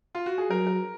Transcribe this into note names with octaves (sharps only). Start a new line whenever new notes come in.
F4
F#4
G#4
F#3 A#4
A#4